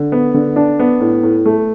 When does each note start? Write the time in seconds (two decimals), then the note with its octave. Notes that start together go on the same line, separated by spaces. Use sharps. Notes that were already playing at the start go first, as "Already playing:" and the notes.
Already playing: D3
0.12 B3
0.34 D3
0.56 D4
0.79 B3
1.01 A2
1.23 A2
1.46 A3